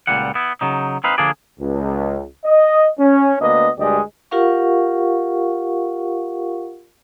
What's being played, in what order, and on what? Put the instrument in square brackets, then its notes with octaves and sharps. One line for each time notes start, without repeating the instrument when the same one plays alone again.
[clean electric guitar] C#2 A#2 G3 F#5
B3 E4
C#3 F#3 D#4
C4 D#4 B4 F5
D3 F3 A#3 D4 G#4 D5
[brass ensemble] C#2
D#5
C#4
D2 A#3 B3 D4 B4 D#5
D2 G2 G#3 G4 D5 D#5
[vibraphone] F4 G4 A#4 F5 F#5 C#6